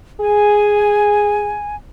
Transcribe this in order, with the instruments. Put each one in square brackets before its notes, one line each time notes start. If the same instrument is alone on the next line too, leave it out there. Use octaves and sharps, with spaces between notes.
[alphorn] G#4 [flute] G#5